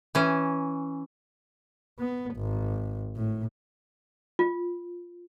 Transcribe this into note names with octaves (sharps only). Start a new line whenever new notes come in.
E3 C#4
B3
G#1
A2
F4